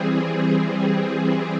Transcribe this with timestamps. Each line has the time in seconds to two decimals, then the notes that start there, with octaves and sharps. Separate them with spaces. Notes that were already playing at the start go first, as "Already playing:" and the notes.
Already playing: E3 G3 C4 G#4
0.55 G#4